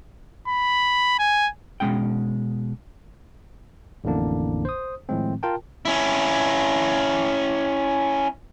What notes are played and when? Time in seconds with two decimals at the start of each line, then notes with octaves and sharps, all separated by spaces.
0.48 B5
1.19 G#5
1.80 B2 D#3 G#3 C#4 G5
4.04 A1 F2 A2 D3 A#3 D4
4.65 C5 D#6
5.09 A2 D#3 F3 G#3 C4
5.43 F4 A#4 G5 A5
5.85 C#4 E4